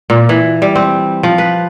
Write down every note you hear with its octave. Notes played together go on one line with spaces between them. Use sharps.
A#2
E3
G3
C4
F3
B4